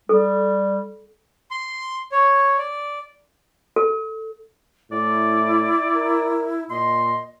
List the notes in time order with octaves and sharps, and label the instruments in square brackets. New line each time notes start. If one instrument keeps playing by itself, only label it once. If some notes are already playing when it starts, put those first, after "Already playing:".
[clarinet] G3 [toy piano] A4
[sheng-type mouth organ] C6
C#5
D5
[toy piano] A4
[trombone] A2 [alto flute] E4 [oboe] D5
[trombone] A#4
[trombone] A#2 [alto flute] D#5 [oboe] C6